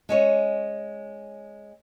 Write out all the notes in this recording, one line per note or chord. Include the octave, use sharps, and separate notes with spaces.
G#3 C#4 C#5